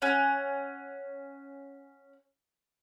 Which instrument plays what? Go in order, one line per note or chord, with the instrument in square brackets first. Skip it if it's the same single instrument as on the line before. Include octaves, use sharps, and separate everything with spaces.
[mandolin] C#4 F#5